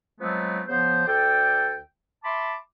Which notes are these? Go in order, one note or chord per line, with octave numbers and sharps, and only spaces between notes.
F3 F#3 G#3 A3 B3 C4
C#3 F3 B3 C5
D2 A4 D5 G5
E5 A5 B5 C6 D6